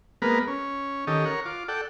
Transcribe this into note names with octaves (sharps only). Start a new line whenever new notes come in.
G#3 A#3 B3 A#4 B4
C#4
D#3 C#4 G4 A4 D#5
A#4 C#5 F#5
F4 D6
A4 D5 F#5 G5